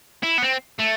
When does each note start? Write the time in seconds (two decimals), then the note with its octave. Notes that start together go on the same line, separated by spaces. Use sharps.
0.23 E4
0.38 B3
0.43 C4
0.80 A3